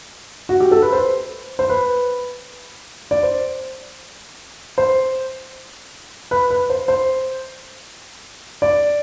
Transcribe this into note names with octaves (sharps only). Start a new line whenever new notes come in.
F#4
G4
A4
B4
C5
C5
B4
D5
C5
C5
B4
B4
C5
C5
D5